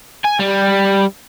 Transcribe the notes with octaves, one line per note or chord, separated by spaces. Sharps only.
G#5
G3